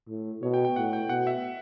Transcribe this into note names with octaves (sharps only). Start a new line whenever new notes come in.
A2
B2 C#5
G5
G5
A2 F#5
G5
B2 F#5
E5